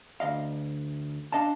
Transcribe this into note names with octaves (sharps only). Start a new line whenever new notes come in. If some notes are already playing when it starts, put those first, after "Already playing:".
D2 D#5 F5
D4 D#5 F5 A5